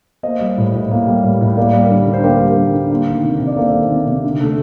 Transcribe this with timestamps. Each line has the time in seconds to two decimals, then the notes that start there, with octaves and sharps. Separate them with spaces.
0.23 A#3 C5 D#5
0.40 G3
0.58 A2
0.74 A2
0.91 A#3
1.07 G3
1.24 A2
1.41 A2
1.57 A#3 A#4 D5
1.74 G3
1.90 D3
2.07 D3
2.13 C5
2.23 A#3 G4 A#4
2.40 G3
2.57 D3
2.74 D3
2.91 A#3
3.07 D#3
3.23 C3
3.40 C3
3.47 D5
3.56 A#3 A4 C5
3.73 D#3
3.90 C3
4.06 C3
4.24 D3
4.41 A3